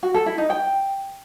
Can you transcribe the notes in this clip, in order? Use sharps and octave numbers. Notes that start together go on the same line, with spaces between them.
F#4
A4
E4
D#4
G5